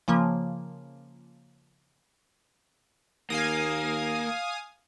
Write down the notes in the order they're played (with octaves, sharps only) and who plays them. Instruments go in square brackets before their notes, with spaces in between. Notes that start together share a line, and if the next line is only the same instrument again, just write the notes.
[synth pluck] C#3 F3 A#3
[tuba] D#2 [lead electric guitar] A#3 [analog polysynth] F5 G#5 D#6